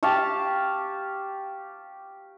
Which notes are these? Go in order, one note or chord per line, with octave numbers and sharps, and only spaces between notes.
G4 F5 A5 C#6